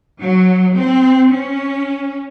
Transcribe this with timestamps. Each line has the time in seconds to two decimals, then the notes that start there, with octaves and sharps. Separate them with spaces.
0.20 F#3
0.76 C4
1.31 C#4